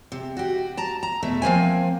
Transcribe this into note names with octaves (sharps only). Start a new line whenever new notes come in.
C3
F#4 G4
A5 A#5
A#5
E2 B2 A3 E5
F3 A#3 C4 G#5